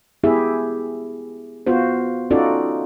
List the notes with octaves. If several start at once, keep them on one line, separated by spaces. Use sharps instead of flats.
B3 E4 G4 G#4 E5
B3 F4 F#4 C5
C#4 D#4 F4 F#4 A4 D5